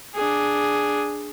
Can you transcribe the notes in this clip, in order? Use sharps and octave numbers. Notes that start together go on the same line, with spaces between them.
D4 G#4